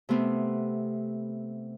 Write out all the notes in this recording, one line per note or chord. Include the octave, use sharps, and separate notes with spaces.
C3 A3 B3 C4